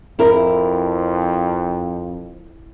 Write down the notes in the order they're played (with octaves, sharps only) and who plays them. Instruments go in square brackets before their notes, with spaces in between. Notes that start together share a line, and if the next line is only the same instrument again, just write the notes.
[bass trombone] F2 [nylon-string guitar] E4 A#4